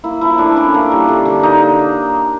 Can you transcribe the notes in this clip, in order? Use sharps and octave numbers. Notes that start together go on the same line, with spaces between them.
A#3 E4
F3 E4
A2 D4
C#4 D4
A#3
G3
D3
D3
A#3 D#4